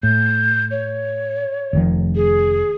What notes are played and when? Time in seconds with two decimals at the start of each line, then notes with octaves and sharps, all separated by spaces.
0.03 A2 G6
0.71 C#5
1.73 F1 D#3 F3
2.16 G#4